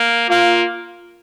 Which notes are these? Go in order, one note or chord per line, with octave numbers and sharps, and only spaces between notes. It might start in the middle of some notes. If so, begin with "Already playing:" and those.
Already playing: A#3
A#3 F4